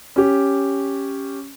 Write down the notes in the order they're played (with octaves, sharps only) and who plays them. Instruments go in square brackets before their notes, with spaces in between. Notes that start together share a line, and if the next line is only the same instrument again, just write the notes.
[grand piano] C#4 G4